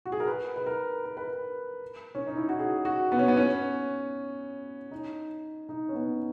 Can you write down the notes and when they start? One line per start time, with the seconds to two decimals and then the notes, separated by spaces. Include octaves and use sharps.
0.06 F#4
0.12 G#4
0.20 A#4
0.27 B4
0.56 B4
0.66 A#4
1.05 A#4
1.17 B4
1.28 A#4
2.15 C#4
2.27 D#4
2.37 E4
2.49 F#4
2.59 G#4
2.85 F#4
3.12 B3
3.19 C#4
3.28 B3
3.37 C#4
4.91 D#4
5.69 D#4
5.89 C#4
5.95 B3